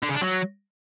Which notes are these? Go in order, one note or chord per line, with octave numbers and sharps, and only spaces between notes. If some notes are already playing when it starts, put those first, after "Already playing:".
D3
C#3
D4
F#3